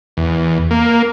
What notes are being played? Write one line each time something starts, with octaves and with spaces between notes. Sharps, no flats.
E2
A#3